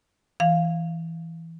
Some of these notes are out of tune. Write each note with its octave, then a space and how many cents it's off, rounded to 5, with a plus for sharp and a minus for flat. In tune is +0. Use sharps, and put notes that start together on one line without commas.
E3 +0 F5 +0